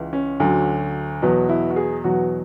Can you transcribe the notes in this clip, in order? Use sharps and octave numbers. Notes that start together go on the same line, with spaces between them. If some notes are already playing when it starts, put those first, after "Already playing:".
Already playing: C#2 C#3 E3
C#4
D2 D3 F#3
E2 B2 F#3
E4
F#4
G#4
E2 B2 F#3 F#4